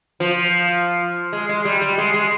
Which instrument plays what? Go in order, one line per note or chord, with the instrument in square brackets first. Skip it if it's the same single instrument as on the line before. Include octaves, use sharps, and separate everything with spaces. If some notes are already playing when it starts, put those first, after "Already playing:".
[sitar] F3
G#3
G#3
G3
G3
G#3
G#3